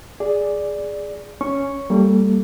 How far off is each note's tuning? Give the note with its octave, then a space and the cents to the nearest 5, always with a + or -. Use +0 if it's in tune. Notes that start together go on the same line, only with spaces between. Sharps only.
G#4 +0 D5 +0
C#4 +0 C#6 +0
G3 +0 A#3 -30 A4 +0